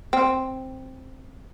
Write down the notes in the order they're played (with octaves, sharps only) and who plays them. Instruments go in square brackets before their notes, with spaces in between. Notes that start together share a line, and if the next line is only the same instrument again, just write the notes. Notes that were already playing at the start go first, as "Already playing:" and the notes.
[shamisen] C4